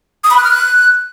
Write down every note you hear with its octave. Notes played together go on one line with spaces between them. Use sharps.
D#6
B5
F#6
F6
F#6